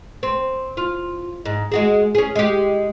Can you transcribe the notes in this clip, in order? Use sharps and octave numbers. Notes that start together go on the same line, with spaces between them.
C4
F4
G#2
G#3 F#4 G#4
C#4 G#4
G#3 G4